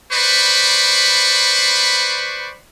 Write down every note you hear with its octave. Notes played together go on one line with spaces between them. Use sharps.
B4 C5 D5 B5 C#6